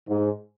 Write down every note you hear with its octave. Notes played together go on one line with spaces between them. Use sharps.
G#2